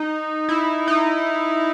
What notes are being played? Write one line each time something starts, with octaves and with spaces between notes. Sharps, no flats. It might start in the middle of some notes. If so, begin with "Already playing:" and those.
Already playing: D#4
E4
D#4